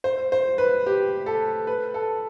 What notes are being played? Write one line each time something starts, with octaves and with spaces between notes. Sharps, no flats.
C5
C5
B4
G4
A4
B4
A4